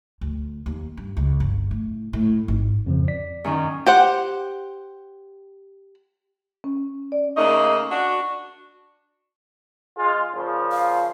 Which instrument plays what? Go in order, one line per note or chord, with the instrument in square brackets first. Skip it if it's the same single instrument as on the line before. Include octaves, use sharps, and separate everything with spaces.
[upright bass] D2
D#2
G2
C#2
G1
A2
A2
G#1
[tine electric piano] F2 C#3 F3
D5 B6
[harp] F#2 D#3 C#4
[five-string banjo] G4 C5 F#5
[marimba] C#4
D5
[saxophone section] C#3 A3 A#3 D#4 D#5
D4 F#4
[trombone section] G#3 F4
A#2 C#3 F3
[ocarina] F5